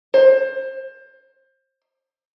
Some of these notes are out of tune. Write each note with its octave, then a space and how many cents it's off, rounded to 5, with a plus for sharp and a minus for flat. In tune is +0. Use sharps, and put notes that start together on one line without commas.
C5 +25